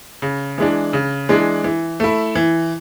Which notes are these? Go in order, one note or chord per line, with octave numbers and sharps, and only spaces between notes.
C#3
E3 G#3 D4
C#3
E3 G#3 D4
E3
A3 E4
E3